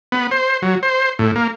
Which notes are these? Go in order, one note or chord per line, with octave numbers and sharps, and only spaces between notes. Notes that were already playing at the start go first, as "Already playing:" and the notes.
B3
C5
F#3
C5
A2
A#3